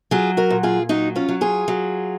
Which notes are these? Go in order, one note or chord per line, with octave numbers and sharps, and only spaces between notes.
F#3 F4 G#4
F#4 A#4
A#2
F4 G#4
F#3 D#4 F#4
C#4 F4
F#3
F4 G#4
F#3